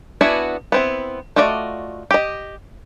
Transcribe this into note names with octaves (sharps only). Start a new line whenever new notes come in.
B3 D4 E4 F#4 G#5
B3 C4 E4
A3 F4 F#4 D5 D#5
G4 D#5